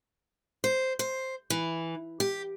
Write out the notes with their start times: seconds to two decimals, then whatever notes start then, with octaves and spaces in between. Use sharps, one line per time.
0.64 C5
0.99 C5
1.50 E3
2.20 G4